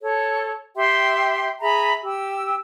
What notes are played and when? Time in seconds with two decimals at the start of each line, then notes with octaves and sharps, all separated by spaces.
0.01 A4 C#5
0.76 G4 E5 G5 C6
1.61 G#4 E5 A#5 B5
2.03 G4 E6